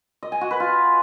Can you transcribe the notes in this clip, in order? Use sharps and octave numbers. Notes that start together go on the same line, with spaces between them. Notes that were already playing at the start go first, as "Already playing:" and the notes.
D#5
G#5
F#4
B4
F4